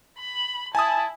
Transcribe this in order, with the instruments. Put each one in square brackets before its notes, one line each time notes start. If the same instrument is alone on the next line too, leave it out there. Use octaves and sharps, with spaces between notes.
[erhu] B5
[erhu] E4 [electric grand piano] G#5 D#6 [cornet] A5